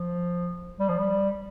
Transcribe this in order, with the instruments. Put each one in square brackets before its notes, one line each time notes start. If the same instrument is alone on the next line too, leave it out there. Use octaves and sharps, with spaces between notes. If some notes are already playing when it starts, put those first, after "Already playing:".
Already playing: [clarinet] F3
G3
F3
G3